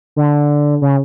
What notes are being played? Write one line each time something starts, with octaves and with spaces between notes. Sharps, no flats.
D3
C#3